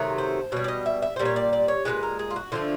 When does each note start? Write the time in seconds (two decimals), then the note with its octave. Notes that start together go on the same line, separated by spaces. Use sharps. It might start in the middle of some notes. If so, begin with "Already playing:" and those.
Already playing: C3 D#3 F#3 A3
0.18 C5
0.52 B2 G3 C#5
0.64 D5
0.68 D#5
0.86 E5
1.02 E5
1.16 A#2 G3 C5
1.25 C#5
1.36 D5
1.53 D5
1.68 C#5
1.85 A#2 F3 G#3 B4
2.03 A#4
2.19 G#4
2.31 F4
2.36 F#4
2.52 D3 F3 A3 F4